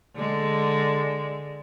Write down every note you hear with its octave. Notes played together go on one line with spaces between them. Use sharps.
D3 G#3